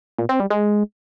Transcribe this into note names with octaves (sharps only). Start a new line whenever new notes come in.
A#2
C4
G3
G#3